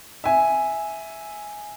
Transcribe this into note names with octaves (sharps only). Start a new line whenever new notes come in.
E5 G#5